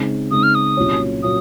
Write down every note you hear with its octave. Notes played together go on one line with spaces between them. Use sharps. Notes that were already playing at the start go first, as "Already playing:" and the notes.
Already playing: C#3 G#3 C4 D#4
C#3 G#3 C4 D#4 D#6
F6
D#6
C2 A#2 F#3 C#4
A#2 F#3 C#4 D#6